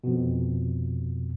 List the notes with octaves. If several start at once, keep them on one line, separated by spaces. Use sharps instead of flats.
F2 B2